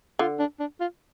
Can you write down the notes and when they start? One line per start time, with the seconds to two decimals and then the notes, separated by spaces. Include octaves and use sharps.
0.19 D3 F4
0.39 D4
0.60 D4
0.80 F4